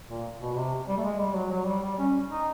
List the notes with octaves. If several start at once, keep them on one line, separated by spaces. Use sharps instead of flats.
A#2
B2
C3
G3
A3
G#3
G3
F#3
F#3
G3
G3
C#4
D#4